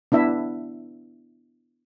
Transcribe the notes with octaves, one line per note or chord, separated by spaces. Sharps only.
B3 D4 E4 E5